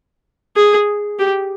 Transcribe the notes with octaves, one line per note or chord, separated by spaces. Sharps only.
G#4
G4